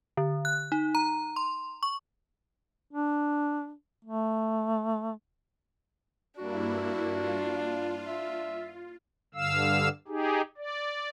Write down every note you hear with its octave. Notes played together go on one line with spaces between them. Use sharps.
D3
F#6
D#4
A#5
C6
C#6
D4
A3
G2 A#3 D4 E4 F#4
F4
E5
G2 D3 F5 E6
D#4 G4 G#4
D5